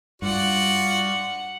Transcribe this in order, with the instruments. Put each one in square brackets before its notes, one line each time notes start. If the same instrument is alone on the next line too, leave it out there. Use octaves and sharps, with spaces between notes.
[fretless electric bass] G2 [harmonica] F4 F#4 D5 [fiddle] F#5